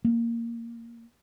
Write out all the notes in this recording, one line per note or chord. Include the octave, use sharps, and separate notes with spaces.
A#3